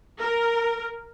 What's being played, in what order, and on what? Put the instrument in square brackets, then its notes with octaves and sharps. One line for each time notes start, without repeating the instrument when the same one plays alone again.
[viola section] A#4